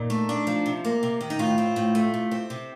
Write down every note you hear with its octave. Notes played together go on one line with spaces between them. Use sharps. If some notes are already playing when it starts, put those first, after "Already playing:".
Already playing: A#2 D#4
A3
D4
F3
C3
A#3
C3
D#3
D#4
A2 F4
C4
A2
A3
C3
C4
C3